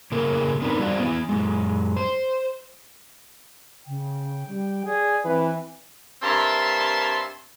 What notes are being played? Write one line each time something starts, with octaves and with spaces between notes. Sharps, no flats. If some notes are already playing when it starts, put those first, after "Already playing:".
A2 C#3 A#3 G#4 A#4
B3 C4 D4 D#4 A#4 B4
G3 F#4 C5 D5 E5 F5
B3 E4
F#2 G#3
C5
C#3 G5
G3
G#4 D5
E3 C4 B4
G2 C4 A#4 E5 A5 C6